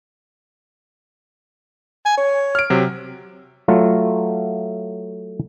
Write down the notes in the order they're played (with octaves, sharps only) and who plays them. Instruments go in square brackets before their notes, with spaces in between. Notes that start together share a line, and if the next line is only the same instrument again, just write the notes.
[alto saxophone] G#5
C#5
[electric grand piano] F6 D7
C3 F#3
[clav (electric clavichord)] F#3 A3 F4